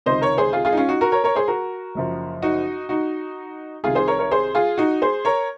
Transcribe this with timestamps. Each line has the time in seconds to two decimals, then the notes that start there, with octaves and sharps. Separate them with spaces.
0.06 C#2 C3 D#3 C5 D#5
0.21 A#4 C#5
0.38 G#4 C5
0.53 F4 G#4
0.65 F4 G#4
0.72 D#4
0.77 C#4 F4
0.88 D#4 F#4
1.01 F#4 A#4
1.12 A#4 C#5
1.24 A#4 C#5
1.35 G#4 C5
1.48 F#4 A#4
1.95 F#1 F#2 F3
2.42 D#4 F#4
2.89 D#4 F#4
3.83 C2 C3 D#3 F4 G#4
3.95 G#4 C5
4.08 A#4 C#5
4.19 A#4 C#5
4.31 G#4 C5
4.55 F4 G#4
4.78 D#4 F#4
5.02 G#4 C5
5.25 A#4 C#5